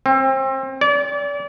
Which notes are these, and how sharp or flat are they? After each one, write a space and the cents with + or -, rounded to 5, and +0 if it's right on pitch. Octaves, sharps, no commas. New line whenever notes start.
C4 +30
D5 -35